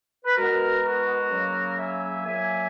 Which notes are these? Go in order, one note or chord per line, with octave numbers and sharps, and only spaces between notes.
B4
B2 G#3 B3 F#4 A#4
F#4 A#4
C#3 F#3 A#3
E5 G#5
A#2 F#3 A#3 E5 G#5